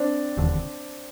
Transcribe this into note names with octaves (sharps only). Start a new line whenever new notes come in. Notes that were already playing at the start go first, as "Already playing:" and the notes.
Already playing: C4 D4
E1 D#2 D3